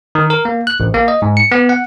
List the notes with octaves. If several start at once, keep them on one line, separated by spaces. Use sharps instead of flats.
D#3
A#4
A#3
F#6
A1
A#3
D#5
G#2
C#7
B3
F#5